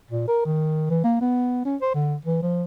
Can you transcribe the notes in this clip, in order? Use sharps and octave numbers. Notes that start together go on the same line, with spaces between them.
A#2
A#4
D#3
E3
A#3
B3
C#4
C5
D3
E3
F3